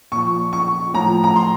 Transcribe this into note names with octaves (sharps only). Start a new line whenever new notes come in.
A#2 F3 C#6
C#6
A2 F3 A#5
A#5
C6